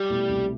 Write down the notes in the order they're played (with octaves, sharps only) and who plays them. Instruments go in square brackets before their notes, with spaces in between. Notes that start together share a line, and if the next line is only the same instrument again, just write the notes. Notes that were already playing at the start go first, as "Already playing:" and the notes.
Already playing: [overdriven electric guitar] G3
[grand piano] B2 A3 E4
C2